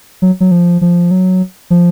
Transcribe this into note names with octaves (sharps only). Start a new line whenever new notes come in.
F#3
F#3
F3
F3
F#3
F3